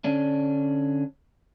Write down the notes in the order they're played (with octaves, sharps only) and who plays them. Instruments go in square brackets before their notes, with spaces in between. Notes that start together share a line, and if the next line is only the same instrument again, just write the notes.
[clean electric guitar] D3 C#4 D4